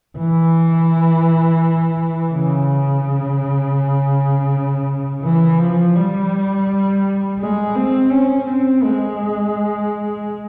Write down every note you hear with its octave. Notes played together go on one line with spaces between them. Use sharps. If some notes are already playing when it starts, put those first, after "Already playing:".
E3
C#3
E3
F3
G3
G#3
C4
C#4
C4
G#3